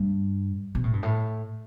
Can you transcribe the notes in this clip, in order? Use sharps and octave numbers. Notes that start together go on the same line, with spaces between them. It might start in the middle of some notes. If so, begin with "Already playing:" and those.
Already playing: G2
B2
A2
G2
A2